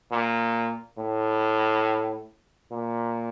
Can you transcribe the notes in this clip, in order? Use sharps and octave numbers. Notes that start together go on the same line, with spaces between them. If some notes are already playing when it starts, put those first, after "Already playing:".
A#2
A2
A#2